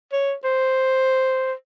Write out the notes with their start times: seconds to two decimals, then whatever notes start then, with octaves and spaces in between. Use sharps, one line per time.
0.12 C#5
0.44 C5